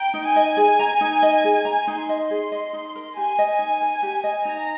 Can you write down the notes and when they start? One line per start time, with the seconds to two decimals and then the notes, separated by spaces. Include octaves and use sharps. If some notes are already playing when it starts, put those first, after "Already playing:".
Already playing: G5 A#5
0.14 D#4
0.25 G#5
0.36 D#5
0.57 G#4
0.79 A#5
1.01 D#4
1.22 D#5
1.44 G#4
1.65 A#5
1.87 D#4 C6
2.09 D#5
2.30 G#4
2.52 D#5
2.73 D#4
2.95 A#4
3.16 G4 G#5
3.39 D#5
3.59 D#4
3.81 A#4
4.03 G4
4.24 D#5
4.45 D#4 A#5